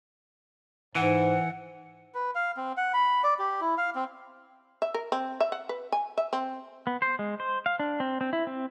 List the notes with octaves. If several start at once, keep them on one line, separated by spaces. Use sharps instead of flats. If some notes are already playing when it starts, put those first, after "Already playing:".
G#2 E3 F#5
B4
F5
C4
F#5
B5
D5
G4
E4
F5
C4
E5
A#4
C4
E5
F#5
B4
G#5
E5
C4
B3
C5
G#3
C5
F5
D4
C4
C4
E4
C4